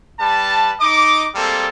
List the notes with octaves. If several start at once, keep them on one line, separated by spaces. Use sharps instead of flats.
G3 B4 A5
D#4 D#5 D6
G3 G#3 A#3 C4 A4